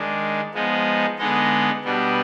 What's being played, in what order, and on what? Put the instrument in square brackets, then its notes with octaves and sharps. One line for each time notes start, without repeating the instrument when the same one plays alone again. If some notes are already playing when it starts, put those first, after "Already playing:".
Already playing: [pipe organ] D#3 G#3 D4
F3 G#3 B3 D#4
D3 G#3 B3 D#4 D#5
B2 G3 B3 D4